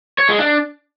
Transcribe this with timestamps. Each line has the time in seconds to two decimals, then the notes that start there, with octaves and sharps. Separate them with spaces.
0.18 C#5
0.29 G#3
0.39 D4